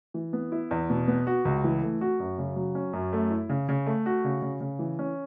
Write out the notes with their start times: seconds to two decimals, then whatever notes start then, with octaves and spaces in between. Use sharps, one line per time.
0.14 E3
0.33 B3
0.52 E4
0.71 E2
0.90 B2
1.08 B3
1.27 F#4
1.45 C#2
1.64 E3
1.83 A3
2.01 F#4
2.20 F#2
2.38 C#3
2.56 F#3
2.75 C#4
2.93 F#2
3.13 A3
3.31 E4
3.49 C#3
3.69 C#3
3.86 A3
4.06 F#4
4.25 C#3
4.42 C#3
4.61 C#3
4.79 E3
4.99 C#4